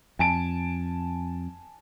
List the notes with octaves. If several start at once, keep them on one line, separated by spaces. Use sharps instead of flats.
F2 G#5 A5 D7